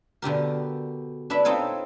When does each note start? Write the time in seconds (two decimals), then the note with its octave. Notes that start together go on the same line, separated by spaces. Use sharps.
0.22 B2 D3 G4 A#4
1.30 D4 E4 B4 E5
1.45 C4 D#4 F4 A4 C#5